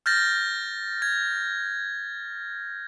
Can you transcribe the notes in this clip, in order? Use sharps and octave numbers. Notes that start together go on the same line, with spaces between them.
F6 G6 A6 A#6
G#6